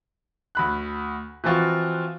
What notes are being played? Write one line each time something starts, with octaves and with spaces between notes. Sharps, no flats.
D2 B5 F#6
E3 F3 C4 F4 F#4